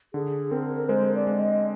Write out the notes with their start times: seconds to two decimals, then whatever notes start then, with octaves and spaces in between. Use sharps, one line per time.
0.14 D3 G#4
0.51 C4 A#4
0.89 G#3 C5
1.15 D5
1.27 G#3
1.39 D#5